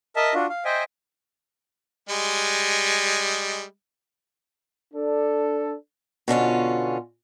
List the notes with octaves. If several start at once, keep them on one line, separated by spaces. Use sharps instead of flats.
A#4 D#5 E5 A5
D4 F4 F#4
F5
C5 D#5 E5 G5 G#5
G3 G#3 D#5
D4 A4
B2 D3 C#4 F4